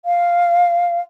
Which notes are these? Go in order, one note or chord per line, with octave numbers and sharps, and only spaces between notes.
F5